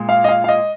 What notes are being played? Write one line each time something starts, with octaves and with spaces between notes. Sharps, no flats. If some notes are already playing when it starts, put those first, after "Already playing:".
Already playing: A#2 G#3
F5
D#5
F5
F5
D#5